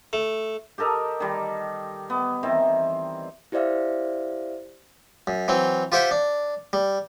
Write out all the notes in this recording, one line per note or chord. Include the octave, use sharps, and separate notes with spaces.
A3
G4 A4 A#4 D#5
D#3 G3
B3
D#3 E3 C4
E4 G4 C5 D5 E5 F5
F#2
E3 F#3 C4
F4 G4 C5 E5 F#5 G5
D4
G3